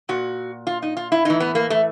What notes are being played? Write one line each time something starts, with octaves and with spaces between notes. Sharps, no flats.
A#2 F#4
F4
D#4
F4
E4
A2 E3 D#4
B3
A#3
A3